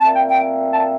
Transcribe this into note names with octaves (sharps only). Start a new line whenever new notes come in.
A#2 A3 C4 A5
G5
G5
A5